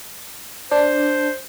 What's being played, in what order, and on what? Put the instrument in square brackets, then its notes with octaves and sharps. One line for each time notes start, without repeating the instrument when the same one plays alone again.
[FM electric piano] D4 [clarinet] C5